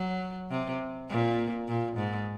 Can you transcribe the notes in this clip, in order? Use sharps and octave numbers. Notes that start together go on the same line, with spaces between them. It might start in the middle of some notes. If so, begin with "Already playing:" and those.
Already playing: F#3
C3
A#2
A#2
G#2